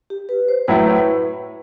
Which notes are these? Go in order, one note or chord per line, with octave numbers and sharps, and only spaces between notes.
G4
B4
C5
A2 F#3 A3 E4 B4